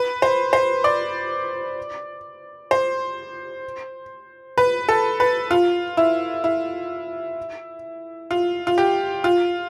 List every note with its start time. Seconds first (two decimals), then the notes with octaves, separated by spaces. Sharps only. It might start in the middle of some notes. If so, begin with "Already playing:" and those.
Already playing: B4
0.22 C5
0.53 C5
0.84 D5
2.71 C5
4.58 B4
4.89 A4
5.20 B4
5.51 F4
5.97 E4
6.44 E4
8.31 F4
8.67 F4
8.78 G4
9.24 F4